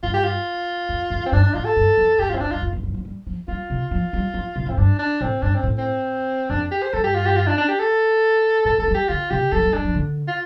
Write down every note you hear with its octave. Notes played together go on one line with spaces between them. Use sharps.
G2 F4
G4
F4
F2
F2
C4
G2 D4
D4
A2 F4
A4
G2
F2
G2 G4
G2 F4
C4
F2 D4
G2 F4
F2
G2
G2
F3
G3
F3
G3 F4
C3
F3
G3
F3
C3
A2
C4
G2 D4
D4
A2 C4
G2 D4
C4
A2
C4
F2 D4
G4
C5
G2 A4
G4
F4
G4
F4
D4
D4
G4
A4
A2 A4
F3 A4
G3
G4
D3 F4
C3 G4
F3 A4
G3
G3 D4
F3
D3
F4